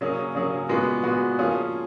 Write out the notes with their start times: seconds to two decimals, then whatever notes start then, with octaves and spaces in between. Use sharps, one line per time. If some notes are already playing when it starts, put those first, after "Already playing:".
0.01 C#3 F#3 A#3 C#4 G#4
0.35 C#3 F#3 A#3 C#4 G#4
0.69 A#2 G#3 B3 F#4
1.03 A#2 G#3 B3 F#4
1.38 F3 A#3 C#4 F4 G#4